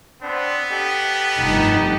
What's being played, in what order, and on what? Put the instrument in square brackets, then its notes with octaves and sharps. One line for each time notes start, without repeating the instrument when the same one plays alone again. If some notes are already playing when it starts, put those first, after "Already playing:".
[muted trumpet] B3 [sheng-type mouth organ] C4 D4 C5
[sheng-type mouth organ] G4 A4 D#5
[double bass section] F1 G2 [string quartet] D#4 A5